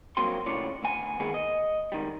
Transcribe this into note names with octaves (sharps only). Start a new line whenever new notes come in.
G2 A#2 F#3 A#3 C4 C6
A2 C#3 F4 C#5 D5
D2 B3 G#5
D#3 G#3 A#3 B3 G#4
D#5
G#2 D#3 G3